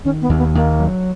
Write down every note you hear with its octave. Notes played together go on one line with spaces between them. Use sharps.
D#3 C#4
B3
D#2
B3
D#2 A#3
F#3